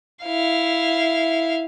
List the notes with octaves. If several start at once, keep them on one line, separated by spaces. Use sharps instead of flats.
E4 F5